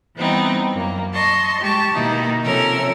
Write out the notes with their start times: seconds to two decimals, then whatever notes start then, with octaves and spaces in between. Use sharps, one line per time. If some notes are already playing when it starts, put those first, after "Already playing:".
0.16 E3 G3 B3 C4 D#4
0.73 F#2 A#3
1.13 D#5 A5 C6 C#6
1.61 G#3 G4 A5 C#6
1.94 B2 D#3 A#3 D#4 E4 A#4
2.44 C3 F3 C#4 A4 A#4 E6